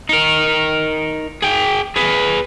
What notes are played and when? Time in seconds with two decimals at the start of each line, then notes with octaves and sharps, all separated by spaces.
0.09 D#4 A#4
1.42 G#4 G5
1.96 G#4 B4